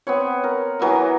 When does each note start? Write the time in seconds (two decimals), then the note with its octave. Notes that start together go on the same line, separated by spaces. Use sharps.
0.07 B3 C4 C#5
0.44 A#4
0.79 E3 F#3 B3 A#4